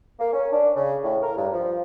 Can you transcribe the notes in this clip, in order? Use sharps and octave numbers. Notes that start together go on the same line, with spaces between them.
A#3
C#4
D4
C#3
A2
A#4
G2
F3